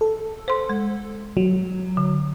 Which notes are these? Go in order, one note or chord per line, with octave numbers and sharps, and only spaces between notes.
A4
C5 C6
G#3
F#3
D3